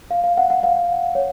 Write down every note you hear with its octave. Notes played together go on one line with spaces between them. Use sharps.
F5
F5
F#5
F#5
F5
C#5